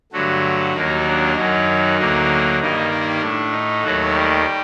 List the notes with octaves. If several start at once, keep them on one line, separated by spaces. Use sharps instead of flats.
G2 D3 F#3 A3 F#4
D#2 D#3 F#3 A#3 D#4
D4
F#2 D#3 F#3 D#4
D2 D3 F#3 A#3
G2 D#3 G3 A#3 D#4
D#4
A2 A3 D4
D#4
D#2 D#3 F#3 A3 F#4
G3 G4